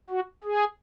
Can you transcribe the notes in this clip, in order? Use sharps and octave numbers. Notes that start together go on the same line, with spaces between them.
F#4
G#4